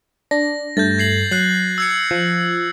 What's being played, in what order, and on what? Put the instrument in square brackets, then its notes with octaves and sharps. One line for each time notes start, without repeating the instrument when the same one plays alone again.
[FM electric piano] D4 [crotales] A#6
[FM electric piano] G2 A3 [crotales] G6 A6
[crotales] G#6 C7 F#7
[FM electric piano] F#3 [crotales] F#6 C7 F#7
[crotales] E6 G#6 C#7
[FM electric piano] F3